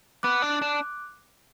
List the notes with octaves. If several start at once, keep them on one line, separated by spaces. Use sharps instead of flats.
B3 D6 F#6
D4
D4